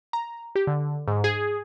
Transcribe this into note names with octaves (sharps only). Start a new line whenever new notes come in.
A#5
G4
D3
G#2
G#4